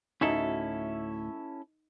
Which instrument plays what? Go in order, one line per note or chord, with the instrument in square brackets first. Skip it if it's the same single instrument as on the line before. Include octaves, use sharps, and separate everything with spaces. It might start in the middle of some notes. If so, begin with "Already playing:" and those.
[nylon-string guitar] D2 A2 F#4 [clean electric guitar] C#4 E4 A4 [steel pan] D#4